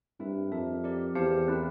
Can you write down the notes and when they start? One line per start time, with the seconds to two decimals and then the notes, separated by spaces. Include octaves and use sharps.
0.20 G2 C4 E4 A#4 E5
0.52 F2 G4 A#4 E5 A5
0.84 G4 A#4 D5
1.15 E2 G4 C5 F5 A5
1.48 C4 E4 A#4